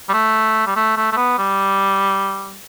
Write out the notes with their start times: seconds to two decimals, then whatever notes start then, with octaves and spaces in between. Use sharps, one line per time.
0.09 G3
0.13 A3
0.66 G3
0.76 A3
0.97 A3
1.12 A3
1.17 B3
1.38 G3